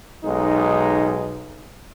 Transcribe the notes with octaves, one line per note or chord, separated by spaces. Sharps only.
B1 G#3 D#4